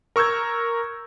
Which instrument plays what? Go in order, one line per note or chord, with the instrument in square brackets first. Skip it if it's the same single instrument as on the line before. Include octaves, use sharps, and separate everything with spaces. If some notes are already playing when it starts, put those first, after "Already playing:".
[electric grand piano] A#4 C#6 E6 G6 G#6